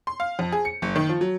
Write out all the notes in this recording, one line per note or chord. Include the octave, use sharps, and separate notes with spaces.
C6
F5
F2
G#4
C#7
F#1
D#3
F3
F#3